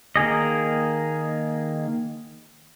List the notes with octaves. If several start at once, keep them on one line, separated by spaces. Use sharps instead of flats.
D#3 A#3 G#4 D#5